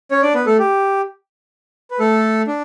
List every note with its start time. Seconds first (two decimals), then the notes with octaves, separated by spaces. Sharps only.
0.11 C#4 C#5
0.22 D4 D5
0.34 B3 B4
0.46 A3 A4
0.59 G4
1.91 B4
1.99 A3 A4
2.47 D4